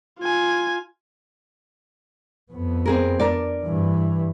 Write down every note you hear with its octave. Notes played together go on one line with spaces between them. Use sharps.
F4 G#5
F2 B3
C4 G#4 A#4
D4 A#4 D5
G2 E3